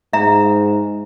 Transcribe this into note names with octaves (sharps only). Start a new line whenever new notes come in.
G#2 E5 A#5